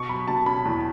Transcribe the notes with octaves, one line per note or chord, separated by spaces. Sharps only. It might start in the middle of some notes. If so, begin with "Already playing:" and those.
Already playing: B2 C#6
F#3 B5
B2 A5
C#4 B5
E2